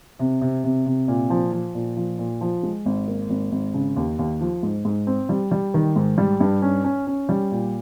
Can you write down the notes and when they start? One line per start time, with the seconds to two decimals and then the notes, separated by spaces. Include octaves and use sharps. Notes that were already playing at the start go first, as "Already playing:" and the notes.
0.19 C3
0.41 C3
0.64 C3
0.86 C3
1.08 A#2
1.30 F3
1.52 F3
1.75 A#2
1.96 F3
2.19 A#2
2.41 F3
2.63 G#3
2.86 G#1
3.08 A#3
3.30 G#1
3.52 G#1
3.74 C#3
3.96 D#2
4.19 D#2
4.41 F3
4.63 G#2
4.85 G#2
5.07 C4
5.29 G3
5.51 G3
5.74 D#3
5.96 G#2
6.18 G3
6.40 G2
6.62 C#4
6.84 C#4
7.07 C#4
7.29 G3
7.51 A#2